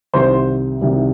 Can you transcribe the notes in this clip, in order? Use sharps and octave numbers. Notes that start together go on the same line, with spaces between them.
C2 C3 D#3 C5
C2 C3 D#3